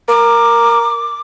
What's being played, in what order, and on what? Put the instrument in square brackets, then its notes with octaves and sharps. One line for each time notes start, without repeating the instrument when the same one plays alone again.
[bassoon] A#4 [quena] D6